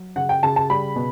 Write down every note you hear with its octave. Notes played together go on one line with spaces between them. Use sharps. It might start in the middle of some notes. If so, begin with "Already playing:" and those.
Already playing: F#3
C#3 F#5
G5
C#3 A5
A5
G3 B5
B2